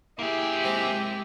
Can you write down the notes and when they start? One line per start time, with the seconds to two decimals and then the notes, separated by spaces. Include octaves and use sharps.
0.19 A#3 E4 G4 G#4
0.64 C3 G#3 C4